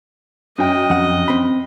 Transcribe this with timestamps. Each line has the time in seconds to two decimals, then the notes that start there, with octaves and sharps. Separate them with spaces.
0.58 F#2 D#5 G5
0.90 F2 F#5
1.28 C4 B5